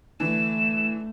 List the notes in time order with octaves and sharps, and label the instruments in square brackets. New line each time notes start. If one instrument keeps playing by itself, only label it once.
[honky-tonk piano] D3 E3 [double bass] A3 [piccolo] E7